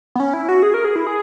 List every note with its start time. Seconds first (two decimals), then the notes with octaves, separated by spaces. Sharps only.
0.16 B3
0.20 C#4
0.34 E4
0.49 F#4
0.63 G#4
0.74 A#4
0.85 G#4
0.96 E4
1.07 G#4